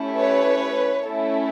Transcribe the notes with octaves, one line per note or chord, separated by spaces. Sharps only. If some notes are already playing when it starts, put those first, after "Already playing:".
Already playing: A3 C#4 E4 G4
B4 C#5
A3 C#4 E4 A4